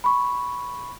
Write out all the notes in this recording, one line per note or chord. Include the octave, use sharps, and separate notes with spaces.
B5 C#6